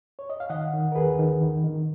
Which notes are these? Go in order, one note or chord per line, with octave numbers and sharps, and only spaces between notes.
C#5
D#5
F5
D#3 D#5 F#5
D#3
A#4
D#2 G#4 B4
D#3
D#3
D#3